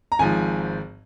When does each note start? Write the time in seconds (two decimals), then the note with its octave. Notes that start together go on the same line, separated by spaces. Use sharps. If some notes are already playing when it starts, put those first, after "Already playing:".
0.12 A#5
0.19 G#1 G#2 F3 G#5